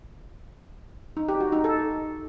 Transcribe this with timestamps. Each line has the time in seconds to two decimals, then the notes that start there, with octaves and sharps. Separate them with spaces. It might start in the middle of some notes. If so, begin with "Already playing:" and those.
1.17 D#4
1.29 G4
1.40 F#4
1.52 D#4
1.64 A4